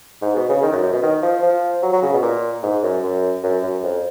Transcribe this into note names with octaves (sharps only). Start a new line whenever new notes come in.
G#2
B2
C#3
D#3
F#2
F#2
B2
D#3
F3
F3
F#3
F#3
C#3
B2
A#2
G#2
F#2
F#2
F#2
F#2
F2